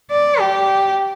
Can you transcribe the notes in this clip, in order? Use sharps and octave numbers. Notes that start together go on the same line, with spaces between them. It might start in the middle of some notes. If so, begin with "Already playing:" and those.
D5
G4